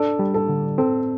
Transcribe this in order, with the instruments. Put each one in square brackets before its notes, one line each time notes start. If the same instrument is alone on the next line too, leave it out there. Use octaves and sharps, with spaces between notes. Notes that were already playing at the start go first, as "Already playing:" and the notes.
Already playing: [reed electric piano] D4 [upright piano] A4 D5
[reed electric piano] G3
[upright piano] A4
[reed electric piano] D3
[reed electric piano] C4 [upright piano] A4